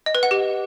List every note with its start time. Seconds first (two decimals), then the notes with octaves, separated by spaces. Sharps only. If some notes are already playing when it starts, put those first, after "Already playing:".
0.06 D#5
0.15 B4
0.23 F#5
0.31 G4